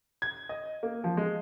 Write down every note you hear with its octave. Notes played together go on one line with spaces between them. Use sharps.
G#6
D#5
A#3
F3
G#3